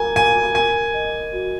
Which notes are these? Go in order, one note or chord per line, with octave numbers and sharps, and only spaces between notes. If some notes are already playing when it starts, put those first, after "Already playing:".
Already playing: A#4 G#5 A#5
A#4 G#5
A#4 G#5
D#5
F#4